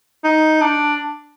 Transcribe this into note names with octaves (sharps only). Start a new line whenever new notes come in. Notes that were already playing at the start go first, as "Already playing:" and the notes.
D#4
D4